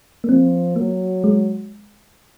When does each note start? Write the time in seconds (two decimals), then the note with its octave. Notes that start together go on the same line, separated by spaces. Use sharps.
0.24 A#3
0.29 F3 C4
0.76 F#3 A#3
1.24 G#3